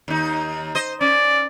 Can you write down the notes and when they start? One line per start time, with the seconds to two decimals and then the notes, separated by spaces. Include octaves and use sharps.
0.08 D#2 D#4
0.75 C5 D#5
1.01 C#4 D5